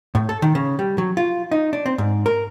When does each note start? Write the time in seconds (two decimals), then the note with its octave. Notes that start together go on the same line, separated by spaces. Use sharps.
0.15 A2
0.29 A4
0.42 D#3
0.55 C#3
0.79 G3
0.98 F#3
1.17 F4
1.51 D#4
1.73 D4
1.86 C4
1.98 G#2
2.26 A#4